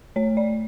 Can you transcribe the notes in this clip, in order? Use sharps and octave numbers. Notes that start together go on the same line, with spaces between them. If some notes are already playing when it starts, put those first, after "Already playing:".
A3 C#5
D5